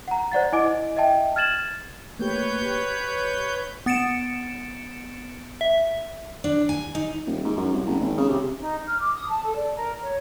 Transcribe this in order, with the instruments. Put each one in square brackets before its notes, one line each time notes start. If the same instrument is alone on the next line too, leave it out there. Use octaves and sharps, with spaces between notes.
[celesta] F#5 A#5
C5 D5 F#5 A6
E4 D#5 G#5 D6 D7
D#5 E5 G5 A5
F6 G#6 A6 E7 F#7
[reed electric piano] A3 A#3 G4 [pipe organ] B4 C#5 G6
[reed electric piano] G4
[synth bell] B3 A6 C#7 D7 E7
E5
[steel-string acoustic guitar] D4
G#5
D#4
[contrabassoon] D#1
G#2
F#2
C2
F#1
G#1
C#3
C3
[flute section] D#4
F6
D6
D#6
A5
A4
D5
A#4
C#5